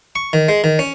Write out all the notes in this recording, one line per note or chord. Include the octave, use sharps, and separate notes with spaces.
C#6
D#3
G#3
D#3
C#4